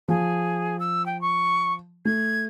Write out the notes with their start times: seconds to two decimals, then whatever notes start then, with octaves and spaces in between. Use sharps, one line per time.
0.08 F3 G#4
0.79 E6
1.06 G5
1.21 C#6
2.05 A3 G#6